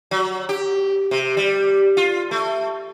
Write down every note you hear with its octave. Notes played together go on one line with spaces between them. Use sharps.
F#3
G4
C3
G3
F4
A3